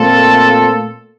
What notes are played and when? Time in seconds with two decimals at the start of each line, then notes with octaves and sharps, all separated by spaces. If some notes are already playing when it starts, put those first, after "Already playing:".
Already playing: A#2 A3 C4 F4 A4